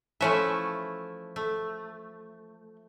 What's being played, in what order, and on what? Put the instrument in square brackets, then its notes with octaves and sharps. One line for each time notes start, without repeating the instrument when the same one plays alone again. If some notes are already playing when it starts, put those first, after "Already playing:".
[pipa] E3 C#4 E4 [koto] F3 A3 E5
[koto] A3